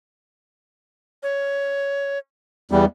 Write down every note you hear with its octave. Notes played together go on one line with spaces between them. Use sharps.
C#5
E2 G3 B3